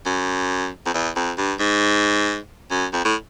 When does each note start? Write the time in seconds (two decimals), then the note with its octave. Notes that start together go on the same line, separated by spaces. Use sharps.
0.06 F#2
0.86 F2
0.94 E2
1.16 F2
1.38 G2
1.60 G#2
2.71 F#2
2.93 F2
3.05 A2